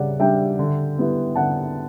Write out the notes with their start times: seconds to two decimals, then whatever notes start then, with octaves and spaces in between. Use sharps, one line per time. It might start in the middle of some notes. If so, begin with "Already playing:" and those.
Already playing: C#3 G3 D5 F#5
0.20 G3 D4 E5 G5
0.59 D3
0.98 G3 B3 E4
1.35 D3 F#5 A5